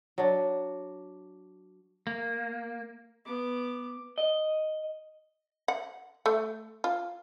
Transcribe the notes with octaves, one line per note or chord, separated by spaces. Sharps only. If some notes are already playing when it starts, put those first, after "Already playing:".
F#3 D4
A#3
B3 D6
D#5
F#5
A3
F4